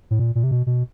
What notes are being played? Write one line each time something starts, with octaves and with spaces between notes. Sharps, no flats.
A2
A#2
A#2
C3
B2
B2